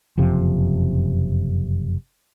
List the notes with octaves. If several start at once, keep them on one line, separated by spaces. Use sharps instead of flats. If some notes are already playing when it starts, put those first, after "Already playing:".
F#1 F2 C3 F3